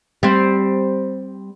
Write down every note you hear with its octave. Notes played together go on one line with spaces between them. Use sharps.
G3 C4